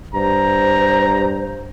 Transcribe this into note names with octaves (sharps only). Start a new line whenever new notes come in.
G2 C5 A#5